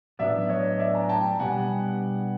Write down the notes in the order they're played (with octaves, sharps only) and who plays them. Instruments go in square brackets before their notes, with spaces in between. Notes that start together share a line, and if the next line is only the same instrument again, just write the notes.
[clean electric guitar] A2 F#3 B3 D4 [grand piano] D5 E5
[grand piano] C#5 D#5
D5 E5
G#5 A#5
G5 A5
[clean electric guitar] B2 G3 B3 D4 G4 [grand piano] F#5 G#5